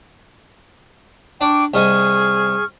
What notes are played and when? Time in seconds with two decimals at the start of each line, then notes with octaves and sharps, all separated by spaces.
1.41 D4 G5 C#6 D6
1.74 C2 G#4 D#5 G#5 C#6 F6